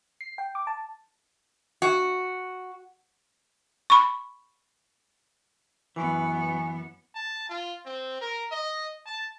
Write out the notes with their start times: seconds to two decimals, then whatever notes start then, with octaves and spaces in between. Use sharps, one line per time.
0.21 C7
0.38 G5
0.55 D6
0.67 A5
1.82 F#4
3.90 B5 C#6
5.96 F#2 E3 B3 G#5 C#6
7.15 A5
7.49 F4
7.85 C4
8.21 A#4
8.51 D#5
9.06 A5